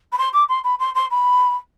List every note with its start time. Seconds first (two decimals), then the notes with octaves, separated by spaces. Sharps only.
0.12 B5
0.18 C6
0.33 D6
0.48 C6
0.64 B5
0.79 C6
0.95 C6
1.10 B5